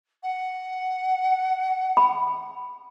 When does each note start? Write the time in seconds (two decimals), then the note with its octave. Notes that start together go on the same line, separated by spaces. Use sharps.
0.23 F#5
1.97 B5